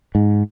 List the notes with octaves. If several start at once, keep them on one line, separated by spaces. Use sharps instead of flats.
G#2